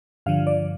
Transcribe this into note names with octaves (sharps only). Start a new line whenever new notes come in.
G2 D3 F3 F5
D5